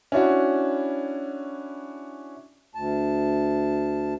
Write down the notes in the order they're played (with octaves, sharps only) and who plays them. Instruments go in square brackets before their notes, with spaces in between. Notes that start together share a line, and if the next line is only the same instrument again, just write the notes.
[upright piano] C#4 D4 E4 F#4
[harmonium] D2 A5